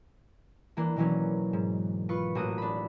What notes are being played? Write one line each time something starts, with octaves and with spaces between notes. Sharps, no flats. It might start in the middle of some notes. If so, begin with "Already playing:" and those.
E3 A#3 D4
B2 D#3 E3 F#3 A#3 C#4
G#2
F4 B4 C#6
A1 A#3 F#4 D#6
D4 B5